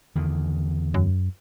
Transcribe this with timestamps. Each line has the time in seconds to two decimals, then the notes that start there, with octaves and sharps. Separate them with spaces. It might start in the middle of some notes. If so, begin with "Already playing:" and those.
0.15 E2 D3 D#3
0.94 F#2